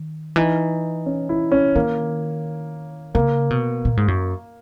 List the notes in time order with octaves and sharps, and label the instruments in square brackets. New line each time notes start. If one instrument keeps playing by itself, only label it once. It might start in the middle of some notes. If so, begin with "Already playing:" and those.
Already playing: [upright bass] D#3
[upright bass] E3 [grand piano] D#4
[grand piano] C#4
E4
C#4
[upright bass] D#3 [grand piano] A#3
[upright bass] C#3 [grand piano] A#3
[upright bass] B2
A#2
G#2
F#2